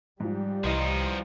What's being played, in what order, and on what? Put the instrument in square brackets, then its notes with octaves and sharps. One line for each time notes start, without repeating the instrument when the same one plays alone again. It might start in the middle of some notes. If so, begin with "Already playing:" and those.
[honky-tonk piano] G#2 F3 [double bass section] G3
[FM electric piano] C2 D#5 C6 [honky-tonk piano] E3 [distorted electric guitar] F3 D#4